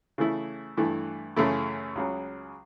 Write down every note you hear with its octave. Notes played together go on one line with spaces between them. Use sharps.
C#3 E3 A3 E4
G2 E3 A3
F#2 C#3 E3 A3 E4
C#2 C#3 F#3